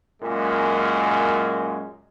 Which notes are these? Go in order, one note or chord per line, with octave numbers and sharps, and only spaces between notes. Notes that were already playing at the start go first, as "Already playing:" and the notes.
F#2 A#2 G#3